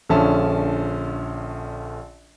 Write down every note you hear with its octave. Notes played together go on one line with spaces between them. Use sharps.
A#1 D3 F3 C#4 E5 A5